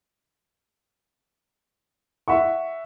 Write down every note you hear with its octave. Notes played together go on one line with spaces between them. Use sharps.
E5 F#5 C#6